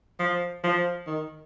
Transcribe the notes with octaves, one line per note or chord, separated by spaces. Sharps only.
F3
F3
D#3